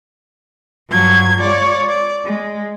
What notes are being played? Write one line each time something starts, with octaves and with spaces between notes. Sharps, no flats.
G2 F3 F#3 G#6
G#3 F4 C#5 D5
D5
G#3